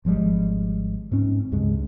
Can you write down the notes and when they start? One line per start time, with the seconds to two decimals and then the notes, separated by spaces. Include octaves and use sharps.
0.05 G#1 F3 G3 G#3
1.12 G#2 C4 C#4
1.52 C#2 G2 C#3 G#3